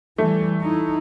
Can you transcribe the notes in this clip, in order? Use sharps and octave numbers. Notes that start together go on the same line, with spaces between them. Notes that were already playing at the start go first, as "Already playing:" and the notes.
E3 G3 A3
D#4 E4